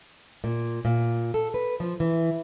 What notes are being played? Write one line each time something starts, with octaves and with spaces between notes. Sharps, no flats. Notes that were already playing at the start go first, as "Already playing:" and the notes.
A#2
A#2
A4
B4
F3
E3